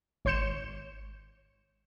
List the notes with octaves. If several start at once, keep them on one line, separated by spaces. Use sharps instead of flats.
G#1 C#5 C6 G6 C#7 E7